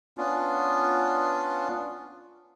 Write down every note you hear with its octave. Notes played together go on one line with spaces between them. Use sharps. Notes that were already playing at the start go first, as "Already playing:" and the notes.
B3 C#4 D4 F4